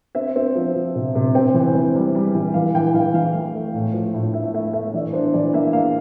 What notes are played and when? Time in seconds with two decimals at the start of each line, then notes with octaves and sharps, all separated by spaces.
0.15 C4 E5
0.36 C4
0.56 F3
0.75 F3
0.95 C3
1.15 C3
1.35 C4 G5
1.54 E3
1.75 C4
1.95 G3
2.15 G3
2.35 E3
2.54 E3 F5
2.75 E3 G5
2.94 E3 F5
3.14 E3 F5
3.34 A3
3.55 A3
3.74 A2
3.93 F3
4.14 A2
4.34 A3 E5
4.54 A3 E5
4.73 A3 E5
4.94 E3 D5
5.13 D4 C5
5.34 E3 D5
5.53 A#3 E5
5.73 A#3 F5